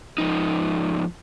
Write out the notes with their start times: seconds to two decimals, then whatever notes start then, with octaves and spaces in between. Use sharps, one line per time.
0.18 G#2 F3 D#4